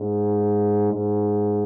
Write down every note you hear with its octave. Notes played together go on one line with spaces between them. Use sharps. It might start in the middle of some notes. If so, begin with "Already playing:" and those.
Already playing: G#2
G#2